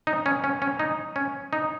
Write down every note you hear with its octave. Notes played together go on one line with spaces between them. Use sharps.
D#4
C#4
C#4
C#4
D#4
C#4
D#4